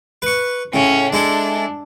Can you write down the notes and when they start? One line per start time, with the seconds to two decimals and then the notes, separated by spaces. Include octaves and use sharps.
0.22 B4 C#6
0.74 A2 C#3 C#4
1.13 G#3 D4 E4 A4